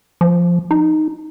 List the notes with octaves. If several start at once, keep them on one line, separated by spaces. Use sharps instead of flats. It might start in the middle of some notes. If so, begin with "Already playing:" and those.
F3
D#4